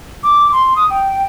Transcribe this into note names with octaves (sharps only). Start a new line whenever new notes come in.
D6
C6
D#6
G5